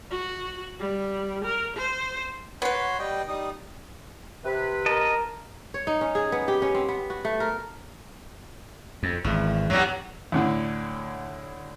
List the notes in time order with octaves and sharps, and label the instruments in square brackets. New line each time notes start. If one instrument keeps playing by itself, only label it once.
[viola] F#4
G3
A#4
C5
[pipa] B3 B4 [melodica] F#4 C#5 C6
[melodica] G3 D#5 G5
G3 D#4 D#6
[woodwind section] C3 B4
[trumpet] A#4 [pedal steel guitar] D#5 A5
[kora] C#5
D#4
C#4
G#4
B3
G4
C#4
C4
B3
F#4
A3
A#4
[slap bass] F2
[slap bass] G#1 [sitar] E2
[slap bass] E2 G2 [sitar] F#3 G3
[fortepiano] D2 A2 D3